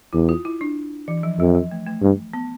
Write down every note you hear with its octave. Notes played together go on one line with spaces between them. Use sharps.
E2 E4
F4
E4
D4
E3
F3
F2 F3
F3
A3
A3
G2
B3